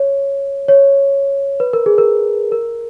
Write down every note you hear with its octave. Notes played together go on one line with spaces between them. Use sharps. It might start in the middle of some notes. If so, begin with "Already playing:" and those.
Already playing: C#5
C#5
B4
A#4
G#4
A#4
A#4